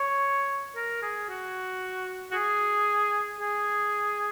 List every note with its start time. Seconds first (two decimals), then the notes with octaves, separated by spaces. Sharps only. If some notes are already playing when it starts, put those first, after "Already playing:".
Already playing: C#5
0.76 A#4
1.02 G#4
1.29 F#4
2.31 F#4
2.34 G#4
3.41 G#4